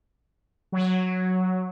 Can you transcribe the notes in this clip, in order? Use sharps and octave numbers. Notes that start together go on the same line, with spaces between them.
F#3